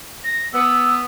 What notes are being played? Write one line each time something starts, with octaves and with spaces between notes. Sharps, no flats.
A#6
B3 E6